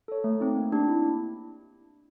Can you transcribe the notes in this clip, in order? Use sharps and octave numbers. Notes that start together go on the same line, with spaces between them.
A4 C#5
A3
C4 D#4
A#3
D4 G4
E4